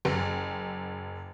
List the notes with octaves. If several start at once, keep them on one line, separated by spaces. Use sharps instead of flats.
F#1